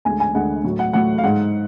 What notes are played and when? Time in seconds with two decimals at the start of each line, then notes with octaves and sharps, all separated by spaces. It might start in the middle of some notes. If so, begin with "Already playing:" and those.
0.05 D2 D3 G#3 G#5
0.20 G#5
0.34 D2 D3 G#3 F#5
0.64 A2 F#3 A3
0.79 F#5
0.93 A2 F#3 A3 F#5
1.18 F5
1.23 G#2 G#3 F#5